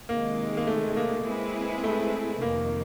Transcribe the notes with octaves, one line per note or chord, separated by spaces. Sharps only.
C3 D#3 G#3 A#3
A#3
A3
A#3
G#3 C4 E4 G#4 B4
A3
F2 C3 D#3 A#3